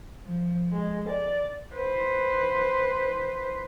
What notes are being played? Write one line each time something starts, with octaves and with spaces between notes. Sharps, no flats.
F3
G#3
D5
B4 C5